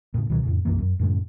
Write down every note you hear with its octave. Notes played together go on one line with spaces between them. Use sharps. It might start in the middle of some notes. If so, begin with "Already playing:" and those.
A2 C#3
C#2 B2 D#3 F#3
F2 A2 C#3
B1 F#2 E3 A#3
F#2
F#2 A2 C#3 G#3